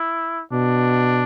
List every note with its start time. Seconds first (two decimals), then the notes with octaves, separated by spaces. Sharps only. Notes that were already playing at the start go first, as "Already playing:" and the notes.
Already playing: E4
0.52 B2 D4